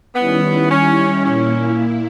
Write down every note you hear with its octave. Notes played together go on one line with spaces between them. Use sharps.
D#3 G3 B3 C#4 E4
C#4
A#2 A#3 C#4 E4